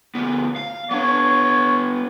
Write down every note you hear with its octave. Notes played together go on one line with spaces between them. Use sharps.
D2 B3
F5
B3 D4 C#5